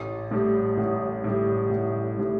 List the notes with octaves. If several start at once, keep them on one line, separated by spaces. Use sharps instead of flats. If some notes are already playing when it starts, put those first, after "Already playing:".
Already playing: A1
A2 G3
A1
A2 G3
A1
A2 G3